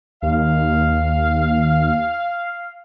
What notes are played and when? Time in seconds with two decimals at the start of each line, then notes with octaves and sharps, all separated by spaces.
0.23 D#2 F5